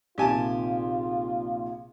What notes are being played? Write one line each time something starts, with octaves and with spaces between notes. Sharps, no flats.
A#1 C3 D#3 F4 G4 G#5 A5